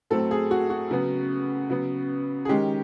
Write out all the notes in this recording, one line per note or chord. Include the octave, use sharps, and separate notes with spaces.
A2 F#3 A3 C4 A4
G#4
F#4
F#4
C#3 F#3 B3
C#3 F#3 B3
G#4
D#3 G#3 C#4 G4